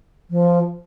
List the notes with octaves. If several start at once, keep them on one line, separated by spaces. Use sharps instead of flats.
F3